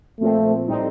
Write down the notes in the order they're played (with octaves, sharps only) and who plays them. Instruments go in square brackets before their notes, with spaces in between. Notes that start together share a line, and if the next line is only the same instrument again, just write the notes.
[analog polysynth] A#2 F3 C4 [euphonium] A3
[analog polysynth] A2 G3 C4 D#4